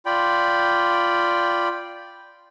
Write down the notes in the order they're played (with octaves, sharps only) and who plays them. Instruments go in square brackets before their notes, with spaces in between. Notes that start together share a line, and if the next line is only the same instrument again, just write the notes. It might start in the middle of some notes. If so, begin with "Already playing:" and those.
[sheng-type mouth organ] F4 D5 G5 B5